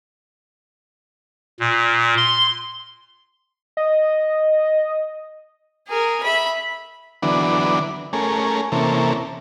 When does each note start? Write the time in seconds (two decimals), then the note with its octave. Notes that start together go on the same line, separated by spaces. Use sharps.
1.60 A#2
2.17 C6
3.77 D#5
5.88 G#4 A#4
6.23 E5 B5
7.22 D3 E3 F#3 B3 D4
8.13 A3 C#4 G#4 A#4
8.72 C3 E3 A#3 C#4 A4